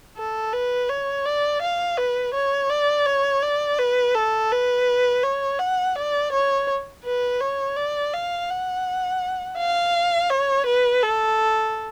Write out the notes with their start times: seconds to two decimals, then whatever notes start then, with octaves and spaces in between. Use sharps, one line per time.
0.17 A4
0.53 B4
0.90 C#5
1.25 D5
1.62 F5
1.98 B4
2.34 C#5
2.70 D5
3.06 C#5
3.43 D5
3.79 B4
4.15 A4
4.51 B4
5.23 C#5
5.60 F#5
5.96 D5
6.32 C#5
7.04 B4
7.40 C#5
7.77 D5
8.13 F5
8.50 F#5
9.58 F5
10.30 C#5
10.66 B4
11.03 A4